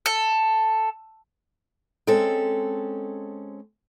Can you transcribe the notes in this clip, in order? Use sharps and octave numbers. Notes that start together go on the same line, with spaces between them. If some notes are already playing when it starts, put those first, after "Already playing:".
A4
G#3 C4 C#4 A4